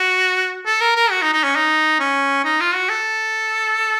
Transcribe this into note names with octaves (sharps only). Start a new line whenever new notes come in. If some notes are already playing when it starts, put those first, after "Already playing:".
Already playing: F#4
A4
A#4
A#4
F#4
D#4
D#4
C#4
D#4
C#4
D#4
F4
F#4
A4